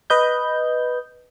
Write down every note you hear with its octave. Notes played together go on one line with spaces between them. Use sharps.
B4 D#5 G6